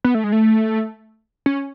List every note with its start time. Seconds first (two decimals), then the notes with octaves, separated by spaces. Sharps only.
0.04 B3
0.15 A3
0.24 G#3
0.32 A3
1.46 C#4